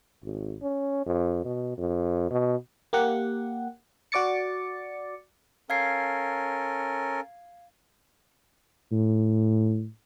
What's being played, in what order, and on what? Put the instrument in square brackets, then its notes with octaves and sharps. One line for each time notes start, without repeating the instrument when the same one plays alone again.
[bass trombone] G#1
C#4
F2
B2
F2
B2
[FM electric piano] A#3 G4 F#5
F#4 D5 D6 A6 C#7
[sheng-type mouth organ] C#4 A4 A#4 [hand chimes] F5 G#6 C7
[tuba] A2